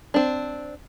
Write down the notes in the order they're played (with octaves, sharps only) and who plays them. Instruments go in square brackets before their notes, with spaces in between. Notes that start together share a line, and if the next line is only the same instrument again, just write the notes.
[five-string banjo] C4 D4